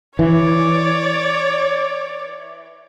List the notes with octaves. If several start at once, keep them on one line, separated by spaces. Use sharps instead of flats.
E3 C#5 D5